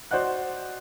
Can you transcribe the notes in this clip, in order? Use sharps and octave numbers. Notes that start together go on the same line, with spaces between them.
F#4 C5 D5 D#5 F#5 F#6